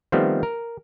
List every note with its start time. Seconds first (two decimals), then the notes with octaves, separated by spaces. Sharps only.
0.12 D#3 F3 G3 A3 B3 C4
0.43 A#4